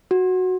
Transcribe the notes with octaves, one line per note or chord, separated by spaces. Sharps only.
F#4